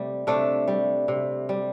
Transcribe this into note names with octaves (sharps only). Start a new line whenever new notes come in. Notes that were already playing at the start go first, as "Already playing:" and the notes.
Already playing: C3 G3 A3
C3 A3 D4
G3
C3
G3